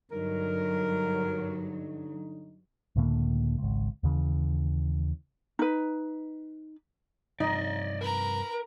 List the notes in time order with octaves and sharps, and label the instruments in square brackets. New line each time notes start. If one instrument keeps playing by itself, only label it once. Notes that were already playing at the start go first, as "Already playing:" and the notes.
[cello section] G2 F#3 [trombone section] D3 D#4 [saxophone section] A#4
[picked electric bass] C#2 A2 D3 A#3
G#1 C#2
D#2 C#3 E3
[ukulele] D#4 B4
[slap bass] G2 C3 F3 [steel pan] D#4 [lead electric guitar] D5 D#5
[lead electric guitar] A#4 [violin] B4 A#5